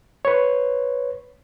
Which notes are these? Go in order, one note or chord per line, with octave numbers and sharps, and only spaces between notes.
B4 C#5